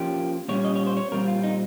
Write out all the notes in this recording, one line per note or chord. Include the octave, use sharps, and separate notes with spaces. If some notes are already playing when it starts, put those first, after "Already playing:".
Already playing: F3 A#3 C#4 G4
A#2 G3 C#4 C#5
D#5
C#5
C5
C#5
A#2 G3 C4 A#4
F4
D#4